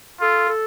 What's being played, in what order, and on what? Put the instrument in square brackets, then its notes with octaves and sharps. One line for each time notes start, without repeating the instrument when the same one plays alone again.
[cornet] F4 [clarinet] A4
[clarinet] A4